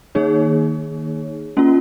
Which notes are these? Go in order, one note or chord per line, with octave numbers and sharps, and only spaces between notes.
D#3 A#3 D#4 G#4 C#5
A#3 C#4 F4